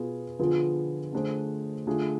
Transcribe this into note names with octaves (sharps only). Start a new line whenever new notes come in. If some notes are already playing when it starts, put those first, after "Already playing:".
Already playing: B2 B3 F4 G#4
D3 F3 B3 F4 G#4
D3 A3 D4 G#4 C5
D3 A3 D4 F4 G#4